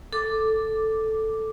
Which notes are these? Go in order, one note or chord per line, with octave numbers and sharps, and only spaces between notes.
A4 D6